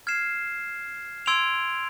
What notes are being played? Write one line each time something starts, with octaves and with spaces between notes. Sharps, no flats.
F6 G#6 C7 E7
C6 E6 G#6 D7 F7